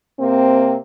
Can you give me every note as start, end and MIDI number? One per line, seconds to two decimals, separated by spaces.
0.20 0.76 48
0.20 0.76 58
0.20 0.76 60